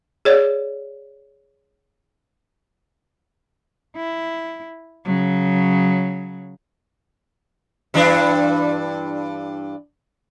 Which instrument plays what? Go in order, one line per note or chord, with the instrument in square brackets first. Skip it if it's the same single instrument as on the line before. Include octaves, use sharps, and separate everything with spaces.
[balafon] G#4 C#5 D5
[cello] E4
C#3 F#3
[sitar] G2 E3 D4